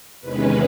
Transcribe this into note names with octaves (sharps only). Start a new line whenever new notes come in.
E2 C3 D#3 G#3 C#4 B4